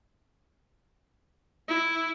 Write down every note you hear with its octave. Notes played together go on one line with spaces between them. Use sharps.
E4